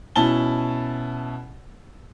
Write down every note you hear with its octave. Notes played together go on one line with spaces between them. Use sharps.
B2 C#4 E4 A5 G7